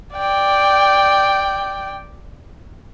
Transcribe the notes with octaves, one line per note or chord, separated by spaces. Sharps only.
D5 G5